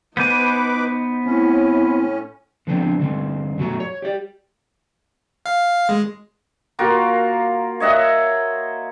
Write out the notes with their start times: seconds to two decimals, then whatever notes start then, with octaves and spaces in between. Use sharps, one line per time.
0.17 B3 D#4 B4 C5 G#5 D6
1.26 A2 C4 C#4 E4
2.67 D3 F3 B3 C4 D4
2.99 D3 G3 C4
3.58 F#2 B2 F#3 A3 F#4 A#5
3.80 C#5
4.02 G4 D5
5.46 F5
5.89 G#3
6.79 A#3 F4 F#4 A#4
7.80 C#5 D#5 E5 F#5